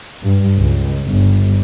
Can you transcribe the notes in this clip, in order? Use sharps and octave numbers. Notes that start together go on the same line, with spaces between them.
G2
C#2
G1